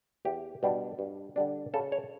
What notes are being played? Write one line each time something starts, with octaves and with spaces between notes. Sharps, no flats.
E2 G4
B2 G3 D4
G2
D3 G3 D4
C#3 A4
C#5